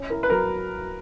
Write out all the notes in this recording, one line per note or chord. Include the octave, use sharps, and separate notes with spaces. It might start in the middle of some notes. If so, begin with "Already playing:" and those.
Already playing: C#4
E4 A#4
B4
F#3 A#4